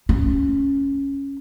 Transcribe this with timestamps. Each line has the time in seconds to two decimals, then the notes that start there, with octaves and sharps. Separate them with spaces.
0.09 C#4